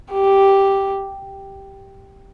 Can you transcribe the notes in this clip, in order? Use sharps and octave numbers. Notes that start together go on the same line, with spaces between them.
G4